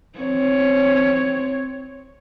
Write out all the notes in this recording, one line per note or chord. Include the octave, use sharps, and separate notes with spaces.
C4 C#5